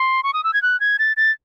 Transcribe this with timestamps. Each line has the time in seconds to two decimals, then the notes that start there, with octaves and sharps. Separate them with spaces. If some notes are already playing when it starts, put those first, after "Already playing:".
Already playing: C6
0.23 C#6
0.33 D#6
0.44 E6
0.54 G#6
0.62 F#6
0.80 G#6
0.99 A6
1.17 A6